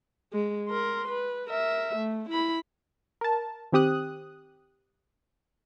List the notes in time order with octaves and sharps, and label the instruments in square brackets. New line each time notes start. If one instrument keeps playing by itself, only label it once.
[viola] G#3
A#4 C6
B4
A#4 E5
A3
E4 B5
[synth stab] A#4 A5
D#3 C4 G4 D#6 F#6